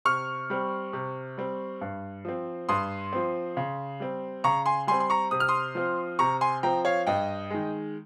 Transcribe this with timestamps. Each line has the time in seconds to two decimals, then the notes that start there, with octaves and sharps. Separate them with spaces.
0.05 C3 C#6 F6
0.50 G3 C4
0.93 C3
1.37 G3 C4
1.81 G2
2.25 F3 C4
2.69 G2 C6 D#6
3.13 F3 C4
3.57 C#3
4.00 G3 C4
4.44 C#3 A#5 C#6
4.66 G#5 C6
4.87 G3 G#5 C6
4.92 C4
5.00 C6
5.10 A#5 C#6
5.31 C3 D#6
5.40 F6
5.48 C6 D#6
5.75 F3 C4
6.19 C3 A#5 C#6
6.41 G#5 C6
6.63 F3 C4 G5 A#5
6.85 C#5 F5
7.07 G2 D#5 G5
7.50 D#3 G#3